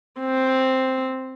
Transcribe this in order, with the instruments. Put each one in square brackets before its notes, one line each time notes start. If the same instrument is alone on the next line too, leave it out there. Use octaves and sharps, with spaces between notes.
[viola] C4